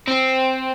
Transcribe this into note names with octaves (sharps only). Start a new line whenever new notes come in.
C4